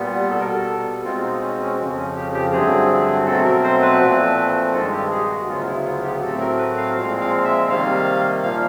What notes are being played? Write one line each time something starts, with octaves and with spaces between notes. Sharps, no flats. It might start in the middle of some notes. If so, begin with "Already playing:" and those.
Already playing: A#2 G3 B3
B2 G3 B3 A4
A#4
A4
B2 G#3 C4 F4
D#4
C#4
C#4
F2 C#3 F3 C4
C#4
G4
G4
G2 D3 F#3 A3 C4 G#4
B2 F#3 A3 C4 A4
A#4
C5
B4
A#2 F3 A3 C4
G2 D#3 G#3 A4
G4
G#4
F#4
D2 C#3 F#3 B3 F4
E4
F4
G4
A2 F#3 A3 C4 A4
A#4
B4
F5
A#2 F3 G#3 C4 F5
F5
E5
C3 D#3 G3 A#3 F5
A#2 F3 A#3 F5